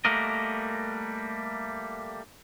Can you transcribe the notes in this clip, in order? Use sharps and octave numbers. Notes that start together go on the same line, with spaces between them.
G3 A3 A#3 F#4 A#4 D#5